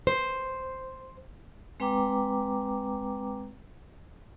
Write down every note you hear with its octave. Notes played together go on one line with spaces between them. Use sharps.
C5
G#3 C4 B4 G5 A#5 D6